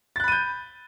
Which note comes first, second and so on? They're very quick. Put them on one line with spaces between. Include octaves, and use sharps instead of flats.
A6 F#6 B5 D#7 G6